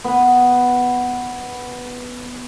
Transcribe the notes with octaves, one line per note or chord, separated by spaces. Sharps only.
B3 B4